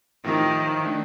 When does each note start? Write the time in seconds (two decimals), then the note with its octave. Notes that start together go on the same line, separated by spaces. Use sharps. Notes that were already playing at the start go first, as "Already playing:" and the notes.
0.24 A2 D#3 F3 C4 G4 A#4
0.85 D#3 A3 D4